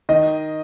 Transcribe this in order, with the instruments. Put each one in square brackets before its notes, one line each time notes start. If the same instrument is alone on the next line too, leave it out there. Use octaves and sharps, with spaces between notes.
[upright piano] D#3 D#5